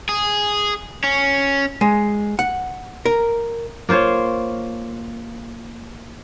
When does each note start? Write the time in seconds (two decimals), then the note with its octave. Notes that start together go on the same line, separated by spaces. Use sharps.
0.09 G#4
1.04 C#4
1.81 G#3
2.39 F#5
3.05 A#4
3.89 A#3 F4 C5 C#5